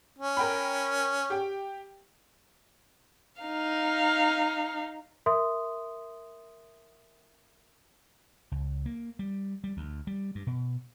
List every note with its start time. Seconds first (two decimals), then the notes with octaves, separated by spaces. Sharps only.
0.19 C#4
0.37 A#4 G5 B5
1.30 G4 G5
3.42 D#4 F5
5.26 A#4 E5 C6 D#6
8.52 C#2
8.86 A#3
9.19 G3
9.64 G3
9.77 D2
10.07 G3
10.35 G2
10.47 B2